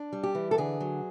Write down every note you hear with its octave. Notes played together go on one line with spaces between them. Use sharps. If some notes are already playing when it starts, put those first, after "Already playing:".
Already playing: D4
G3
G4
E3
A4
D3 G#4
F#3